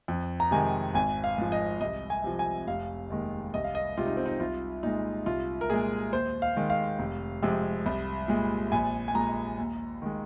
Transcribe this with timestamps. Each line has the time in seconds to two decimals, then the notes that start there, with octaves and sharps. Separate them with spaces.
0.08 F2
0.40 A#5
0.51 C3 D#3 G#3 G#5
0.94 G#1 G#5
1.24 F5
1.38 G#2 F3
1.52 D#5
1.81 C2 D#5
2.10 G#5
2.24 C3 F3
2.39 G#5
2.67 F1 F5
3.10 D#2 D#3 G#3
3.54 C2 D#5
3.64 F5
3.75 D#5
3.97 C3 G#3 F4
4.06 D#4
4.17 C4
4.26 D#4
4.40 C2 F4
4.83 A#2 G#3 D#4
5.26 C2 F4
5.61 A#4
5.70 A#2 G#3 G#4
6.13 D#2 C5
6.42 F5
6.57 D#3 G#3
6.70 F5
6.99 F1
7.43 F2 C3 G#3
7.86 C2
8.28 A#2 G#3
8.72 A#1 G#5
9.08 G#5
9.15 A#2 G#3 A#5
9.58 D#2
10.02 D#3 G#3